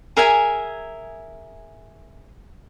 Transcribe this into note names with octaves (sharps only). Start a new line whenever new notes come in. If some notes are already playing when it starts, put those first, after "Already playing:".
G#4 A#4 E5 G#5